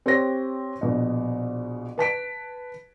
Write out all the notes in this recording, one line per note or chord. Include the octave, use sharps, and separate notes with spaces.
C4 G4 C#5 A#6
A#1 B2
B4 A5 B6 D7